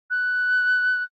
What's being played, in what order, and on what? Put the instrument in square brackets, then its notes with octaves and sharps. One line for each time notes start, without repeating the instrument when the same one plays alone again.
[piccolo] F#6